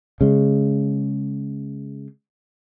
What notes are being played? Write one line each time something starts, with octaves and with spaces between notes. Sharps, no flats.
C#3 G#3